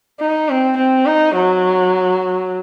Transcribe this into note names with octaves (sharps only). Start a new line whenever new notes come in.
D#4
C4
C4
D#4
F#3